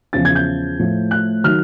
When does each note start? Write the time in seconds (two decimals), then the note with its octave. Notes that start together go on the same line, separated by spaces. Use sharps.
0.13 E2 C#3 F3 A6
0.25 G#6
0.35 G6
0.79 A2 F3
1.11 F#6
1.44 D#3 F#3 F6